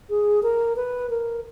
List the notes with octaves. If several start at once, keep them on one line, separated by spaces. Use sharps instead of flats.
G#4
A#4
B4
A#4